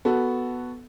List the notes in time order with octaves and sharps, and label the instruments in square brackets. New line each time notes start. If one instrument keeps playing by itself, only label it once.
[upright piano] B3 F#4 A4